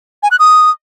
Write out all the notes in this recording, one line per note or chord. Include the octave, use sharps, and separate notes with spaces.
G#5
F#6
D#6